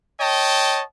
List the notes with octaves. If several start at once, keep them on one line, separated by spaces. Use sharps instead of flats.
C#5 D#5 G5 A5